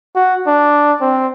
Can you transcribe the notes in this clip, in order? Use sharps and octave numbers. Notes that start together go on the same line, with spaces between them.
F#4
D4
C4